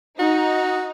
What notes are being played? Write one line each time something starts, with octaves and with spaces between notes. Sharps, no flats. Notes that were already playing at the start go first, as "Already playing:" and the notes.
D#4 F#4